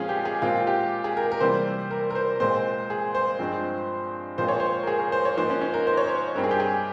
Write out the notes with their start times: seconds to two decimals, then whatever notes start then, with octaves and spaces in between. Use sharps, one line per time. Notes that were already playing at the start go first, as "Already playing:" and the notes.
Already playing: A#2 F3 G#3 C4 C#4 F4 G#4
0.09 G4
0.25 G#4
0.42 A#2 G#3 C4 F4
0.67 G4
1.04 G#4
1.17 A#4
1.32 A#4
1.40 C3 E3 G3 A#3 C5
1.91 A#4
2.10 A#4
2.15 C5
2.40 A#2 G#3 C4 C5
2.90 G#4
3.15 C5
3.39 G2 F3 G#3 C4
4.38 A#2 F3 G#3 C4 C5
4.48 C#5
4.60 C5
4.83 A#4
4.87 G#4
5.00 A#4
5.12 C5
5.25 C#5
5.37 G#2 F3 A#3 C5
5.50 C#4
5.61 C#4
5.74 A#4
5.87 C5
5.97 C#5
6.08 C5
6.35 G2 G3 C4 A#4
6.44 G#4
6.51 G4
6.60 G#4